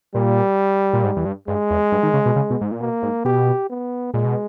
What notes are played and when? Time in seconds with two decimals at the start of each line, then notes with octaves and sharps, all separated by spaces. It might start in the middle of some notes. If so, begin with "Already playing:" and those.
0.14 A#2 G3
0.93 A#2
1.04 G#2
1.16 E2
1.25 G2
1.48 G2 G#3
1.70 E2
1.92 G2
2.03 D#3
2.14 C#3
2.26 B2
2.36 C#3
2.50 B2
2.61 G#2
2.72 A#2
2.81 B2 A#3
3.02 G#2
3.25 B2 G4
3.70 B3
4.13 A#2 G#3
4.24 B2